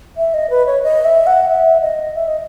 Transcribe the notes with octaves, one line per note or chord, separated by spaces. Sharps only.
E5
D#5
B4
C#5
D#5
E5
F#5
E5
D#5
E5
D#5